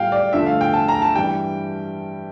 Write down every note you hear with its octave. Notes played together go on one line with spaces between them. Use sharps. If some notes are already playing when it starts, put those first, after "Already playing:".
Already playing: A2 G3 F5 G5
D5
G2 D3 F3 A3 E5
F5
G5
A5
A#5
A5
G2 E3 G3 G5